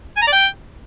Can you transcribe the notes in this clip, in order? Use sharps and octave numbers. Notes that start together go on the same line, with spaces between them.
G#5
A#5
D5
G5